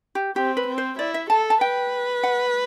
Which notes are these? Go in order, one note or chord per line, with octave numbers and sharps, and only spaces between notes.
G4
C4 G4
B4
C4
C5
E4 D5
E5
A4 A5
A5
B4 G5
F#5